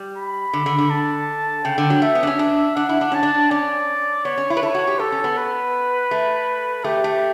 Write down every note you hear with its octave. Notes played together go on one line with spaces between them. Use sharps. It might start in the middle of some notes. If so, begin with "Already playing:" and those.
Already playing: G3
B5
D3
D3
D3
A5
C#3 G5
D3
F#3
A3 E5
B3
D4
C#4
D4
D4 F#5
E4
D4
C#4 A5
D4
C#4 D5
B3 C#5
C#4
E4
B4
A4
F#4
G4
G4 A4
C#4
B3
B4
A3
A3 G4
A3